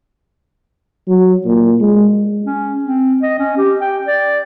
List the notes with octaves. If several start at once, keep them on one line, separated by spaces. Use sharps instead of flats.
F#3
A#2
G#3
C#4
C4
D#5
C#4
G4
G5
D5